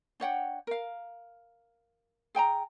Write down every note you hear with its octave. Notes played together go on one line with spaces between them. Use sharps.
D4 C#5 F#5 G5
A#4 F5
G#4 G5 G#5 A#5